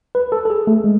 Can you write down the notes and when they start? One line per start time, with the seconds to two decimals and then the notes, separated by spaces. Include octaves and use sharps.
0.15 B4
0.32 A4
0.45 A4
0.50 G#4
0.67 A3
0.84 G#3